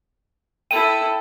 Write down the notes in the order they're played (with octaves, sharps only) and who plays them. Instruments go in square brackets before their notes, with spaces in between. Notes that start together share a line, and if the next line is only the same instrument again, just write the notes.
[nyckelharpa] E4 A4 [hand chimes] G5 [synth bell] D#7